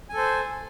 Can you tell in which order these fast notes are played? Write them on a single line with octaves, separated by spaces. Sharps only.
G#5 A4 C5